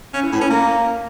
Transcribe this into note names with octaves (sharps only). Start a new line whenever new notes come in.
C#4
E3
A2
C#4
A#3